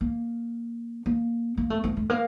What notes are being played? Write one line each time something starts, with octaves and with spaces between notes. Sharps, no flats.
A#3
A#3
A#3
A3
A3
A3
A#3